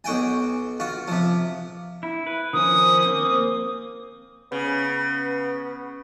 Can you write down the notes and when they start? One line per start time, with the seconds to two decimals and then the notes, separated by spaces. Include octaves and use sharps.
0.04 B1 F#4 G5 G#5
0.80 F4 F#4
1.08 C3 F3
2.03 E4
2.27 B4
2.53 D#3 F3 C#4 D#6
3.05 A#3 C4
4.52 C#3 B3